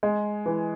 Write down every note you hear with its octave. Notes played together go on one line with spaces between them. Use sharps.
G#3
E3